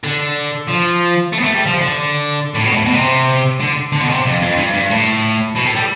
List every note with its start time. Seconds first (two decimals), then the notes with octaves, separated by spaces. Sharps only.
0.04 D3
0.68 F3
1.33 A3
1.38 B3
1.44 A3
1.55 G3
1.66 F3
1.81 D3
2.54 A2
2.63 B2
2.73 A2
2.85 B2
2.95 C3
3.60 D3
3.92 D3
4.01 B2
4.09 C3
4.25 F2
4.42 F2
4.58 G2
4.74 G2
4.91 A2
5.56 B2
5.66 A2
5.76 G3